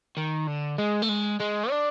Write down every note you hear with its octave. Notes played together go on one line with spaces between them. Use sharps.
D#3
D3
G#3
A3
G#3
G#3
D4